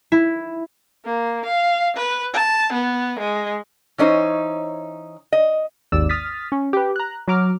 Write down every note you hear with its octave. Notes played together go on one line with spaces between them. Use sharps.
E4
A#3
F5
B4
A5
B3
G#3
E3 C#4 D#4 C5 C#5
D#5
G#1 D#2 D5 E6
D#6 F6 A6 B6
C#4
G4 B4
A#5 F#6
F#3 A#5 D6 F6